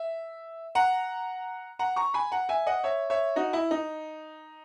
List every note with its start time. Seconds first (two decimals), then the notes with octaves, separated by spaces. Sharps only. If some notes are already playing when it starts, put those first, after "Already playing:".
Already playing: E5
0.75 F#5 A#5
1.79 F#5 A#5
1.96 A#5 C#6
2.14 G#5 B5
2.32 F#5 A#5
2.49 E5 G#5
2.67 D#5 F#5
2.84 C#5 E5
3.10 C#5 E5
3.36 D#4 F#4
3.53 E4
3.71 D#4